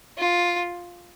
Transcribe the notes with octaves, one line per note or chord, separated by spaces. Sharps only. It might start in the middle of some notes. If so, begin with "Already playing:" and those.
F4